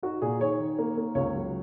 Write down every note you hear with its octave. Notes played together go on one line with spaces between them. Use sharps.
D#4 F#4
A#2 G#4
D#3 C#5
D#3
A#3
A#3
C#2 C#5
F#3